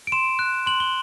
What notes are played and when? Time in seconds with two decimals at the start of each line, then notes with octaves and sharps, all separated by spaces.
0.07 D7
0.12 C6 E7
0.39 F#6
0.66 C6 F#7
0.80 G7